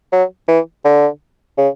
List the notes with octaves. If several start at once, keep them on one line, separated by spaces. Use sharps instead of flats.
F#3
E3
D3
C#3